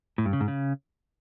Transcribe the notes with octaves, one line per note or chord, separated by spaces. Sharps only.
A2
G2
C#3
G#2
C#3